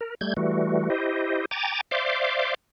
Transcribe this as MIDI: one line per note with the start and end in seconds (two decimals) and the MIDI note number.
0.01 0.15 70
0.21 0.34 55
0.21 0.34 57
0.21 0.34 91
0.21 0.34 92
0.37 0.90 52
0.37 0.90 55
0.37 0.90 57
0.37 0.90 66
0.90 1.45 64
0.90 1.45 67
0.90 1.45 72
0.90 1.45 75
1.51 1.81 79
1.51 1.81 80
1.51 1.81 82
1.51 1.81 86
1.51 1.81 93
1.91 2.54 72
1.91 2.54 74
1.91 2.54 76
1.91 2.54 77
1.91 2.54 84
1.91 2.54 86